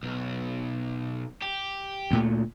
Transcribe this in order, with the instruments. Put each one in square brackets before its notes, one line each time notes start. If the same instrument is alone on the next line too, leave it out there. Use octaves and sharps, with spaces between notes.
[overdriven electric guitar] B1
G4
[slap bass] D2 A#2 A3